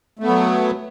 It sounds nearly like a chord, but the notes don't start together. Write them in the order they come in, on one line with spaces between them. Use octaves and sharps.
A3 B3 F#3